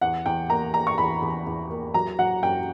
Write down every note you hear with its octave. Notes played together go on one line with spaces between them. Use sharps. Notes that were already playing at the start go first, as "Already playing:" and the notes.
E2 F#5
E2 G5
A#3 A#5
A#3 A#5
C#6
E2 B5
E2
E2
A#3
F#3 A#5
F#3 F#5
F#2 G5